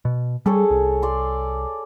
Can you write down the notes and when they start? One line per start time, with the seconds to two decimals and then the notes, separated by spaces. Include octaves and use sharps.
0.05 B2
0.46 G3 G#4 A4 C#5
0.70 C2
1.02 D5 C6